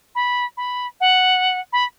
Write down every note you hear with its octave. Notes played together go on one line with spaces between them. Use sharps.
B5
B5
F#5
B5